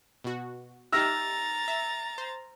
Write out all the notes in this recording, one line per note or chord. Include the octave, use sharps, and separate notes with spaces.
B2 F#4
D#4 G4 E5 A#5 E6 F6 A6 A#6
E5
C5